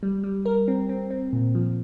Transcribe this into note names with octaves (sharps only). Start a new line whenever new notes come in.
G3
G3
A#4
C4
C4
C4
A#2
F3